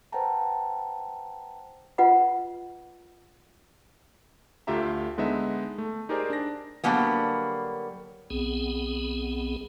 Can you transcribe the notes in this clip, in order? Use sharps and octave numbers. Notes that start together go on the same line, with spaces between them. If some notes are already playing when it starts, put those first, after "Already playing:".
B4 C5 F#5 G5 A5 A#5
F4 B4 D#5 F#5 B5
D2 A3 F4 G4 E5 A#5
D3 G#3 B3 D#4 E5
A3
D#4 G4 G#4 A#4 C5 D5
D4 A#6
D3 F#3 G3 A#3 B3
B1 B3 C4 G#4